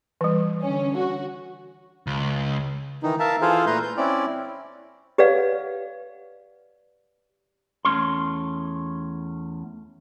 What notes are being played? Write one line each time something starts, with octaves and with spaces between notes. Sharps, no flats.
E3 G3
D3 C#4
F#4
C#2
D#3 E3 D#4
A#4 E5 F5 A5
E3 F4 G#4 A4 C5 F5
A#2 A3 B4 A#5 C6 G6
G6
C4 C#4 E4 D5
G4 B4 C#5 D5 F5 F#5
E2 A3 C#4 C6